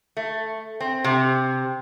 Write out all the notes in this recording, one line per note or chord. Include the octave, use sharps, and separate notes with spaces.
A3
C4
C3